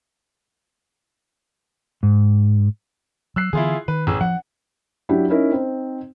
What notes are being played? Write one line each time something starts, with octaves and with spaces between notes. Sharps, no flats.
G#2
F#3 E6 F#6 C7
D3 E3 B3 E4 F4 G#4
D#3 B4
A1 G#4 E6
F3 F#5
F#3 D4 E4 G4
C#4 D#4 E4 A#4
C4 D#4 C5